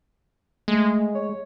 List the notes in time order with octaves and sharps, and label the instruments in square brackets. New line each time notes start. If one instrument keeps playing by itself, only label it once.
[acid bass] G#3 [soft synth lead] A3
[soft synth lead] C#5